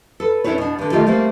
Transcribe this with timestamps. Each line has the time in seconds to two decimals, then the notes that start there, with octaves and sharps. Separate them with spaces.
0.20 A4 B4
0.44 C#4 D4 E4 G4 B4 C#5
0.58 B2 D4
0.79 G2 D3
0.92 D#3 A3 F4 G4 A4
1.07 G3 A3 A#3 C4